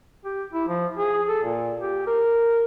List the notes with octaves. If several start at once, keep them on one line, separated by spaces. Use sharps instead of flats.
G4
E4
F3
G#4
A4
A#2
G4
A#4